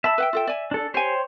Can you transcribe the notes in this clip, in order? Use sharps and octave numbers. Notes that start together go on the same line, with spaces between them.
E5 A5 B5
B4 F#5 G5
F4 A4 G5
D5 G#5
D4 A4
G4 C5 C#5 G5 G#5